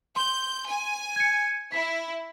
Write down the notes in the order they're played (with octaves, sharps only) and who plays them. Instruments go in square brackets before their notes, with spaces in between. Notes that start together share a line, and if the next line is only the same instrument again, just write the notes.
[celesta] C6 [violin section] G6
[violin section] G#5
[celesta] G#6 C#7
[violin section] E4 [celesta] B6